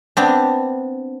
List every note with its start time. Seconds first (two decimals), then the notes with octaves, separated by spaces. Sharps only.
0.17 B3 C4 D4